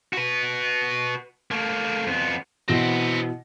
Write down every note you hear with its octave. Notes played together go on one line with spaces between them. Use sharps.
F#4 B4
A3 A#3
F2 B3
B2 E3 B3 C4 A#6